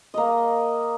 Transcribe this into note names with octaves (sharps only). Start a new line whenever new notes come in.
A#3 D#5